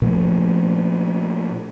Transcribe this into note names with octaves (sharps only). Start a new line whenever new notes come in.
A#2 F3 A3